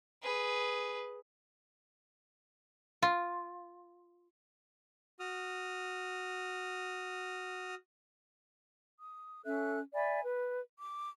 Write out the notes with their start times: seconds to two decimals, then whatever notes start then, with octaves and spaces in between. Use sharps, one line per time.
0.22 G#4 B4
3.02 F4
5.20 F#4 D#6 F6
8.99 D#6
9.45 C#4 A4 E5 F#6
9.94 D5 E5 G#5 B5
10.24 B4
10.78 D6